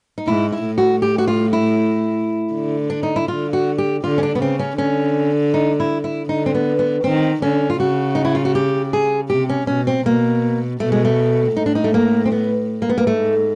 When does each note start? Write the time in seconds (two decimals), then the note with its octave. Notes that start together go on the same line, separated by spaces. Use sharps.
0.18 D#4
0.27 G#2 E4
0.52 E4
0.65 A2
0.78 F#4
1.02 G4
1.18 F#4
1.28 F4
1.53 E4
2.53 D3
2.90 D4
3.03 D#4
3.16 E4
3.28 D3 F4
3.53 F#4
3.78 G4
4.04 D3 F4
4.18 C#4
4.23 D4
4.35 B3
4.41 C#3 C4
4.59 C#4
4.78 D3 C#4
5.54 D#4
5.80 E4
6.04 E4
6.29 D3 D#4
6.46 C4
6.54 B3
6.79 B3
7.04 D#3 C4
7.42 D3 C#4
7.70 F4
7.79 C#3 F#4
8.15 D#4
8.25 E4
8.35 F4
8.45 F#4
8.55 G4
8.93 G#4
9.30 C3 G4
9.49 C#4
9.67 B2 C#4
9.87 C4
10.06 B2 A#3
10.80 B2 A3
10.92 G#3
11.05 A3
11.55 A2 D#4
11.66 D4
11.75 D#4
11.84 A3
11.94 A#3
12.26 C4
12.32 B3
12.82 A#3
12.89 B3
12.98 A#3
13.06 G#2 A3